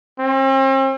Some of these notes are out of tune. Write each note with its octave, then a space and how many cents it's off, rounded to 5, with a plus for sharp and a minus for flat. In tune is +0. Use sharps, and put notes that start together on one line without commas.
C4 +45